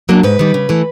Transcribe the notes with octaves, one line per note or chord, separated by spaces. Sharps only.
F#3 A#3 D4
G#2 B4
D#3 G3
C#3
E3 A3